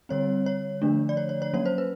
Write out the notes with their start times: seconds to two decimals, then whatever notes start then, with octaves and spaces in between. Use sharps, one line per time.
0.09 D3 G3 C4 C#5
0.46 C#5
0.82 D3 F3 A3 D4
1.09 D5
1.17 C#5
1.29 C#5
1.42 C#5
1.53 F#3 A#3 C#4 C#5
1.66 C5
1.78 B4